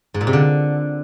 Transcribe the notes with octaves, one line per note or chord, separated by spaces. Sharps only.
G#2
A#2
C3
D3